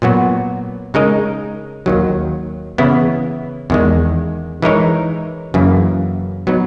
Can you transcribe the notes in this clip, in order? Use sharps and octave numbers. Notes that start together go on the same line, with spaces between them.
A#2 F#3 B3 F#4
C#3 G#3 D#4 A#4 D#5
D#2 D#3 F#3
C#3 E3 B3 E4
E2 D#3 G#3
E3 G#3 D#4 A#4 C#5
F#2 C#3 E3 A#3
F#3 B3 D#4